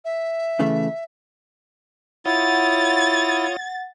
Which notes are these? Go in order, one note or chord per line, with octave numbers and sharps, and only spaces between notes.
E5
C#3 E3 A3
E4 F4 C#5 F#5 D#6 A6